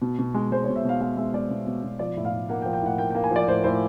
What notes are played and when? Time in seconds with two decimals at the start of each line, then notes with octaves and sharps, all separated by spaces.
0.02 B2
0.19 B2
0.34 G#3
0.52 G#3 C5
0.64 B2 C#5
0.76 E5
0.84 B2 F5
1.00 G#3 F5
1.17 G#3 E5
1.34 G#3 D5
1.50 B2
1.67 B2
1.83 B2
1.99 F3 D5
2.17 A2
2.25 F5
2.32 A2
2.49 A#3 F#5
2.62 G5
2.65 F3
2.73 G5
2.82 A2 F#5
2.98 A#3 G5
3.11 A#3 G5
3.24 G#5
3.31 F3 D5
3.47 A2 C5
3.64 A2 C5